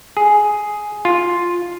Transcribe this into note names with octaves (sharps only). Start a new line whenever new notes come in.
G#4
F4